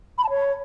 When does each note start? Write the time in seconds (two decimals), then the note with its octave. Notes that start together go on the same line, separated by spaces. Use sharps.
0.18 B5
0.24 A5
0.30 C#5